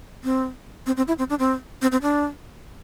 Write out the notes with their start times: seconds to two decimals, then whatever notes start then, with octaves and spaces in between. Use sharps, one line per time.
0.24 C4
0.86 C4
0.97 C4
1.08 E4
1.18 C4
1.30 D4
1.39 C4
1.82 C4
1.92 C4
2.02 D4